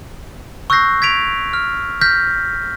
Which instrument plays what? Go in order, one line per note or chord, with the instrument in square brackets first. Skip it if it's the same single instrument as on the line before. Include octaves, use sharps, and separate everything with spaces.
[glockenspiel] C#6 E6 F#6 G6 A#6 C7
G#6 B6 D7 F7
F6
F6 G6 A#6 B6